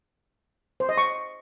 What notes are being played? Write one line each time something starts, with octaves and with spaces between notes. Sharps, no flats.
C5
D#5
C#6